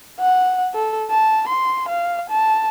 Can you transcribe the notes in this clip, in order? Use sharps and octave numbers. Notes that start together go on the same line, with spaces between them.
F#5
A4
A5
C6
F5
A5